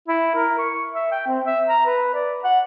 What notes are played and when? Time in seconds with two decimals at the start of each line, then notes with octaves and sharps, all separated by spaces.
0.08 E4
0.35 A#4
0.58 C#6
0.93 E5
1.12 G5
1.27 C4
1.45 E5
1.68 A#5
1.86 B4
2.14 D5
2.44 F#5